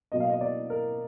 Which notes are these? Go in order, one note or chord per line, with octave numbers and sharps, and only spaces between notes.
B2 F#3 A#3 D#5
F5
D#5
D5
A#4